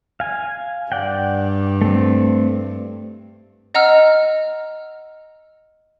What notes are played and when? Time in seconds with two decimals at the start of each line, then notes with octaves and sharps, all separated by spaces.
0.20 F5 G#5
0.92 G2 D5 F#5 G5
1.82 A3 C4
3.74 D#5 F#5 A#5 E6 F6